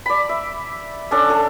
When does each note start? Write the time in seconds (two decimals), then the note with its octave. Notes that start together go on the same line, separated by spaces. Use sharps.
0.06 D5 B5
0.29 E5
1.11 C#4 D4 A4
1.30 A4